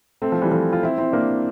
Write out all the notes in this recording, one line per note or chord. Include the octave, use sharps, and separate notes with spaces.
A3 C4
F3
E3 G3
F3 A3
F4
C4 E4
C4 E4
A#3 D4